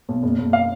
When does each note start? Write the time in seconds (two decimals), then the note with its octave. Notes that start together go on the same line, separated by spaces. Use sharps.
0.09 B1
0.23 F#1
0.38 F#1
0.53 F5